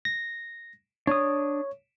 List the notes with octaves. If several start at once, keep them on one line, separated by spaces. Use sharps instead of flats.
A#6
D4 C#5 D#6